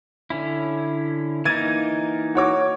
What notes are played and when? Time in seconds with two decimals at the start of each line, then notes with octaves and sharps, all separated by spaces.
0.30 D3 C#4 E4
1.45 E3 A#3 D#4 G#6 A6 D#7
2.35 F#4 C#5 D6